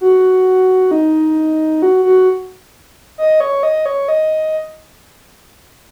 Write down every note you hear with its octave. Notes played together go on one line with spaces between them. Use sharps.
F#4
D#4
F#4
F#4
D#5
C#5
D#5
C#5
D#5